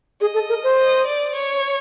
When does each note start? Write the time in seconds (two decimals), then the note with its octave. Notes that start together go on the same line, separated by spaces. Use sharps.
0.21 G#4 D#5
0.34 A4
0.49 A#4
0.64 C5
0.78 D#5
1.06 D5
1.35 C#5